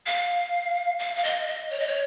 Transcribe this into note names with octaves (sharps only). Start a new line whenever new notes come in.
F5
F5
F5
D#5
D#5
C#5
D#5
C#5